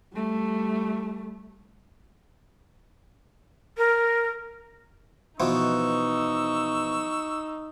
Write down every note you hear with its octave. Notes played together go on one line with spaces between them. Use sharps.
G3 A3
A#4
B2 E3 F3 D#4 C#6 E6